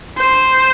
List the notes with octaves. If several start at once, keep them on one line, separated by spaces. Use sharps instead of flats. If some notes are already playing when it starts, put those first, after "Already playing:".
C5